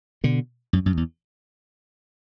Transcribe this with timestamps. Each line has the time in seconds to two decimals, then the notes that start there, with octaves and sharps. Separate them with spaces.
0.24 B2 D3
0.73 F#2
0.86 F#2
0.97 E2